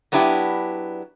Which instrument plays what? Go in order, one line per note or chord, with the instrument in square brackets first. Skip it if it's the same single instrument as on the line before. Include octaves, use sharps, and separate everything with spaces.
[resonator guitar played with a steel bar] F#3 B3 D4 E4 G4